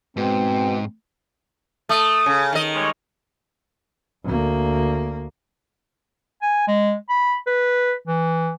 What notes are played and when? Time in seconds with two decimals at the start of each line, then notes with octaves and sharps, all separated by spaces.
0.17 G#2 B2 C4
1.89 A3 D#6
2.26 C#3
2.53 D#3 D#5
2.74 G3 G#3 C#5
4.24 D2 A#3
6.42 G#5
6.68 G#3
7.10 B5
7.47 B4
8.07 E3